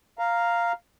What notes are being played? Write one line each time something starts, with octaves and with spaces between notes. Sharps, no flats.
F5 A#5